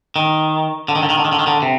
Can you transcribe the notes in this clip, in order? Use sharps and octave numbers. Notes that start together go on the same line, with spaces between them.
D#3
D3
D#3
D3
D#3
D3
D#3
D3
D#3
D3
C3